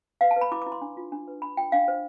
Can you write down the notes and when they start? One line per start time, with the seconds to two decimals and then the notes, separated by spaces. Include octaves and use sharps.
0.21 B4 F5
0.31 A5
0.36 B4
0.41 B5
0.52 E4 D6
0.62 E4 D6
0.72 C6
0.81 D4
0.97 F4
1.12 D4
1.28 B4
1.42 D4 B5
1.57 F4 G5
1.72 D4 F5
1.88 C5